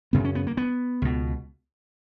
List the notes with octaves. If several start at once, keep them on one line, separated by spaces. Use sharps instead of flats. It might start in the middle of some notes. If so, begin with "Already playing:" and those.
F#2 C#3 B3
C#4
B3
A#3
B3
C#2 B2